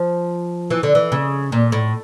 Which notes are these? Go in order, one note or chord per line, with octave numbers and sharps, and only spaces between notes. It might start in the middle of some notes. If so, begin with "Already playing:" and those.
Already playing: F3
E3
D3
E3
C#3
A#2
A2